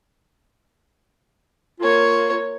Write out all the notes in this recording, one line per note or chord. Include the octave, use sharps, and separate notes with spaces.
A#3 F4 C#5